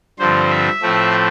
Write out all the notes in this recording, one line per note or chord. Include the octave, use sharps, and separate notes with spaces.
G2 D3 F3 C4 C5
E5
A2 F3 A3 C4